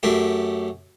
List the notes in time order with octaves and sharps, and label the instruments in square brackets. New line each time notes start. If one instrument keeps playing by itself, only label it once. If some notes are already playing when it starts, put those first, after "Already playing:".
[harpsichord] F#2 A3 G4